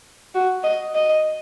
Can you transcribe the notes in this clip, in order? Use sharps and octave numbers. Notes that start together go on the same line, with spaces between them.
F#4
D#5
D#5